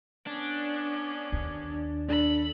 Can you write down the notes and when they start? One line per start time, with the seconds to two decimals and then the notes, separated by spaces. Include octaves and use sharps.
0.27 B3 C#4 D4
1.32 D#2
2.09 D4 A4 B5